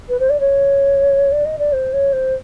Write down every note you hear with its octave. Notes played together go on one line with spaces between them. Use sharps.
B4
C5
D5
C#5
D5
D#5
D5
C5
C#5
C5